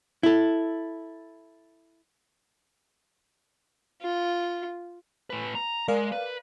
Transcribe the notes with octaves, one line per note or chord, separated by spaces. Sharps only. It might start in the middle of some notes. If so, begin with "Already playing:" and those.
E4 A4
F4
A2 B4
A#5
G#3 A#4 D5 F5
B4